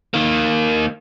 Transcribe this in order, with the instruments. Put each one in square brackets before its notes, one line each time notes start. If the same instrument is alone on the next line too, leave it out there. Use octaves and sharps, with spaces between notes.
[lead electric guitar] D#3 A#3